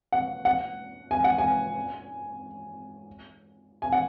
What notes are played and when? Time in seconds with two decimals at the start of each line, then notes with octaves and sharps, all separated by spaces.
0.12 F#5
0.45 F#5
1.11 G#5
1.24 F#5
1.38 G#5
3.82 G#5
3.92 F#5